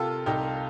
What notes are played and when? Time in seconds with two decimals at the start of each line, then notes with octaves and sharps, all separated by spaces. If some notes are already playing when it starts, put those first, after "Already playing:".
Already playing: C3 F4 G4 A4 A#4
0.26 C2 D#4 G4